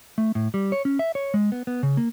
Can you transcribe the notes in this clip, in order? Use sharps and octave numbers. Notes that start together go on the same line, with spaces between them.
A3
A2
G3
C#5
C#4
E5
C#5
G#3
B3
B3
C#3
A#3